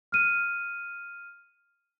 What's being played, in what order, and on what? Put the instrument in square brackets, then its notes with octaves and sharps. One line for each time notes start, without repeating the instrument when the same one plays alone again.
[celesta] F6 D#7